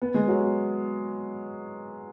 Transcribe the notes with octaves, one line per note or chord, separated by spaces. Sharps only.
B3
G#3
F#3